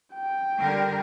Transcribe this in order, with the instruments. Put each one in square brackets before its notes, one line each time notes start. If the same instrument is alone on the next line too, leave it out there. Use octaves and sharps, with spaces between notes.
[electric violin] G5
[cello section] D3 G3 A#4